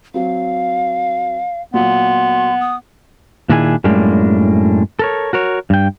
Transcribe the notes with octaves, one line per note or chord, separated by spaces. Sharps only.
F#3 C4 F5
A#2 F#3 B3 C6
D#6
A#2 D#3 D4 E4 G#4 G#5
F#2 A2 G3 G#3 A#3 D4
A4 A#4 C#5
F#4 A#4 C#5
G2 G5